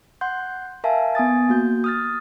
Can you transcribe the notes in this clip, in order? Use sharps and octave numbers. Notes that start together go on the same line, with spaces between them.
F#5 C6 G6
A#4 E5 F5 G#5 A5
B3 G#5 D#6 A6
A#3 F#4 G6
D#6 F6 A6